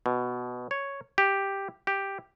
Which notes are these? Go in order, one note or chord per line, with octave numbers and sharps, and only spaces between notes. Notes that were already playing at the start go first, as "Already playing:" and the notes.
B2
C#5
G4
G4